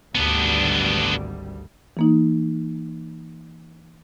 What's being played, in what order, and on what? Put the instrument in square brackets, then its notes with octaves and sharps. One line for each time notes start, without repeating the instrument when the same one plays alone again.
[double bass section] G#1 D2 G3 [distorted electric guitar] B3 D4
[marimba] E3 A#3 D#4